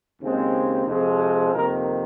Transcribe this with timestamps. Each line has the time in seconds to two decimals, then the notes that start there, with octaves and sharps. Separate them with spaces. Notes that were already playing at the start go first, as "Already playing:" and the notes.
0.21 D#2 C#3 G#3 C4
0.86 F2 C3 F3 G#3 C4
1.52 F2 C3 D#3 A#3 A#4